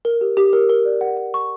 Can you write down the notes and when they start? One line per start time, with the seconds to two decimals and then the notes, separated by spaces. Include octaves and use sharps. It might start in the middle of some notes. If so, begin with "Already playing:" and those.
0.05 A#4
0.21 G4
0.37 G4
0.53 A#4
0.70 A#4
0.85 D5
1.01 F#5
1.17 F#5
1.34 C#6